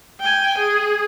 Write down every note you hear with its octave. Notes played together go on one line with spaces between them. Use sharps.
G5 G#5
G#4